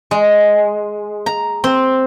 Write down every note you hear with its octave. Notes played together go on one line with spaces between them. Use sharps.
G#3
A#5
C4